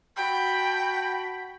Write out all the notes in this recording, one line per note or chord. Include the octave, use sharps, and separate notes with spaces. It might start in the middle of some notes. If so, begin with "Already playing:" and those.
F#4 G5 A5 B5